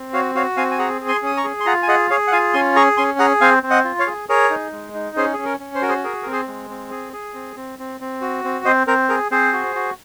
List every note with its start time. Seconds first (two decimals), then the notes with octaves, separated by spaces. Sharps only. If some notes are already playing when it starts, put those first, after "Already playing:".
Already playing: C4
0.13 F#4 C#5 F5
0.35 F#4 C#5 F5
0.57 C4 F5 G#5
0.71 G#5
0.79 G#4 F#5 A#5
1.01 G#4
1.08 G#5 C6
1.22 C#4 D#6
1.37 A#5 C#6
1.44 G#4
1.60 C6
1.66 F4 F#5 A#5
1.83 G#5
1.88 G#4 D#5 F#5
2.10 G#4 C#5 F5
2.27 F#5
2.31 F4 F5 G#5
2.54 C#4 G#5 C6
2.76 G#4 A#5 C#6
2.97 C#4 G#5 C6
3.19 G#4 F#5 A#5
3.41 C4 F5 G#5
3.63 C4
3.70 D#5 F#5
3.85 F4
3.99 C#5 F5
4.07 G#4
4.29 G#4 A#4 C#5
4.50 D#4
4.72 G#3
4.94 D#4
5.16 C#4 G#4 C5
5.34 C#4 G#4
5.45 A#4
5.60 C#4
5.75 C5
5.82 F#4 A#4
5.89 G#4 C5
6.04 G#4 A#4
6.23 C4 A#4
6.32 G#4 C5
6.48 G#3
6.70 C4
6.91 G#4
7.13 G#4
7.34 C4
7.56 C4
7.79 C4
8.00 C4
8.21 F#4
8.44 C4
8.65 C4 C5 D#5
8.87 C4 A#4
9.09 G#4 A#4
9.31 C4 G#4 C5
9.53 F#4
9.75 F#4